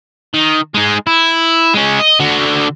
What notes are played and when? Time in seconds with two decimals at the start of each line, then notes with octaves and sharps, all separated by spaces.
0.34 D#3
0.74 G#3 D#4
1.07 E4
1.74 G#3 C#4
2.00 D#5
2.20 D3 F#4